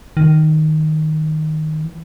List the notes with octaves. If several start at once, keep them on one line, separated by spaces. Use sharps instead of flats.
D#3
E3